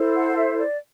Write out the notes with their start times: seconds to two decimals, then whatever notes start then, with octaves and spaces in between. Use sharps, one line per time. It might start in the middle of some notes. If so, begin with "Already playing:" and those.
Already playing: E4 A4 C5
0.15 F#5
0.36 E5
0.58 D5